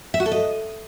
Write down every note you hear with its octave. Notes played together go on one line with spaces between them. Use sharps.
E5
F#4
A4
D#5